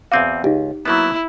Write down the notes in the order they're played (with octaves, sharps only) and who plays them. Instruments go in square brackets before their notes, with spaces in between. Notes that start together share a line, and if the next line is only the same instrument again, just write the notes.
[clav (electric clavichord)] E2 C4 F#4 [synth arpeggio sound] F5 D6 D#7
[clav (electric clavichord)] C#2 [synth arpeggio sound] D#4 G4
[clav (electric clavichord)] F#3 A#3 B3 [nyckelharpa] E4